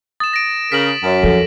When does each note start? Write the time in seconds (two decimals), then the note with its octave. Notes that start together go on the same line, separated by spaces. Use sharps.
0.20 D#6 A6 E7
0.33 A#6 D7
0.72 C#3 G#4 A#4 B6 D7 F#7
1.03 F#2
1.23 E2 F3 A4